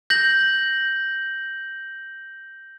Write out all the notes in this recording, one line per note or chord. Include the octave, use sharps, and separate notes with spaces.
G6 A#6 F#7